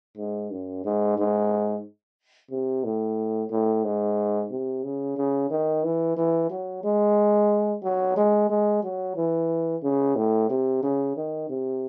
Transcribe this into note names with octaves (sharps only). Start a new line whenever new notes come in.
G#2
F#2
G#2
G#2
C3
A2
A2
G#2
C3
C#3
C#3
D#3
E3
E3
F#3
G#3
F#3
G#3
G#3
F#3
E3
C#3
A2
C3
C#3
D#3
C3